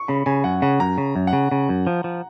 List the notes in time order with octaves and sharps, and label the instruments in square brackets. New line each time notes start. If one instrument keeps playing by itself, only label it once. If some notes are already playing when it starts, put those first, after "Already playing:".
Already playing: [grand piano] C#6
[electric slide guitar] C#3 [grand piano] B5
[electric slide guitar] C#3 [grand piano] G#5
[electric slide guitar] F#2 [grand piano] F#5
[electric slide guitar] C#3 [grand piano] F#5
[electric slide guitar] F#2 [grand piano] A#5
[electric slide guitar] C#3
F#2
[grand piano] F#5
[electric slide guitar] C#3
C#3
F#2
F3
F3